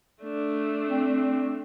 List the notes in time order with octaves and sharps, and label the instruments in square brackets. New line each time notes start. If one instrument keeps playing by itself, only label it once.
[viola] A3 D4
[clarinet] C4